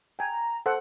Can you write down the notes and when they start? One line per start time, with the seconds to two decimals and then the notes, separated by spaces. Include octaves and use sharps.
0.19 G5 G#5 A#5
0.66 A4 C5 F#5